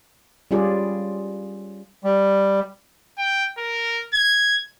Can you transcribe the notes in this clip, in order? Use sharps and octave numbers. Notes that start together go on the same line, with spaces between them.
G3 C#4 F4 G#4 D5
G3
G5
A#4
G#6